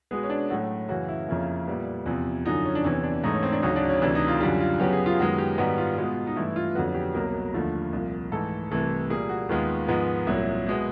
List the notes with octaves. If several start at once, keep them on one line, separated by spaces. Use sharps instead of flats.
B2 G#3 B3 G#4
C#4
D4
A2 F#3 A3 F#4
F#2 C#3 E3 F#4
E4
F2 C#3 F3 A#3 E4
A#2 G3 B3
E2 C3 F3
F#2 D3 F3 D#4
C#4
D4
E2 C3 E3 C#4
D4
G#2 E3 A3 D#4
C#4
C4
D4
D2 C#3 F#3 D#4
D4
C#4
D2 C3 E3 D4
D#4
F4
F#2 D3 G3 F4
F4
F#2 C#3 F#3 B3 G4
G#4
F4
F#2 D#3 G#3 B3 F#4
G4
G#2 D#3 G3 B3 F#4
F4
B2 G#3 B3
D#4
G2 E3 A3 E4
F4
F2 D3 F#3 B3 F#4
G4
C2 B2 F#3 A#3 A#4
D#2 D3 F3 A3
C2 A#2 F3
G#2 E3 A3 A4
C2 C3 E3 A3
A#2 G3 A#3 G#4
F#4
D#2 D#3 G#3 B3 F4
G#2 F3 G#3 B3
C2 A#2 F#3 E4
B2 G#3 B3